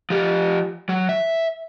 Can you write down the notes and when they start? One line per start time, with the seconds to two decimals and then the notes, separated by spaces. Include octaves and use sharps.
0.10 F3 G4
0.89 F#3
1.09 E5